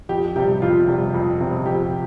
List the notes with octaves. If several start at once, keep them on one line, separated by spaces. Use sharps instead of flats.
F2 G4
C3 G3 G4
F2 F4
C3 G3
F2
C3 G3
F2 G4